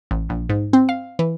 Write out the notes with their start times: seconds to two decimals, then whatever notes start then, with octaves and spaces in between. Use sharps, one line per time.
0.11 A1
0.29 A#1
0.49 G#2
0.73 C4
0.89 F5
1.19 E3